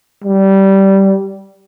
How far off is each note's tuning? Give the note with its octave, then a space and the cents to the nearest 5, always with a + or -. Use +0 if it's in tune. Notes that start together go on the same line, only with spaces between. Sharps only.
G3 -15